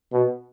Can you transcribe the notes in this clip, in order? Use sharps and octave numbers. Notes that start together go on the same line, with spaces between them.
B2